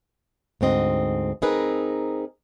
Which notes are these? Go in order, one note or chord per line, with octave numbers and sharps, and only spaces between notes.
D2 G#2 C4 D#5
C4 D#4 G#4 A#4 B4